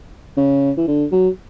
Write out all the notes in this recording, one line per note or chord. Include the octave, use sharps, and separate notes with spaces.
C#3
E3
D3
F#3